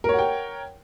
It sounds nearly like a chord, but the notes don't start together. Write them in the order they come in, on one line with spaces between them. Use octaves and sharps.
A#4 C#5 F#5 G5